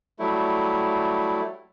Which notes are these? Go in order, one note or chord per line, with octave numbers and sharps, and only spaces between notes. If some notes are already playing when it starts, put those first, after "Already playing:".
F#3 G3 A3 E4